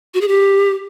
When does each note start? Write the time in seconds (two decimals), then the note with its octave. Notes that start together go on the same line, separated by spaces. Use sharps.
0.14 F#4
0.21 G#4
0.28 G4